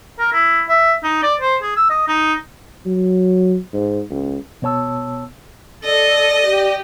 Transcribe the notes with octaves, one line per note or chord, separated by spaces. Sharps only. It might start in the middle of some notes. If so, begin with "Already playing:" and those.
A#4
E4
E5
D#4
D5
C5
G#4
E6
D#5
D#4
F#3
G#2
C#2
B2 B3 C#5 A5 E6
A4 D5 D#5
G4